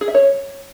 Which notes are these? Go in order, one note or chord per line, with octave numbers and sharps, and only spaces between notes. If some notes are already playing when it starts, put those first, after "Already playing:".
G#4
E5
C#5